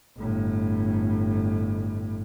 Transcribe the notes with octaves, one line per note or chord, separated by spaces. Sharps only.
G1 A2